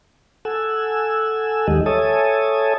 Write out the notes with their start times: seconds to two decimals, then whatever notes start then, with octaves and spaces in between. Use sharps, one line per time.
0.45 A4 F#5 G#5 E6
1.68 D#2 D#3 G#3 G4 D#5
1.86 A4 C#5 E5 G#5 A5 D#6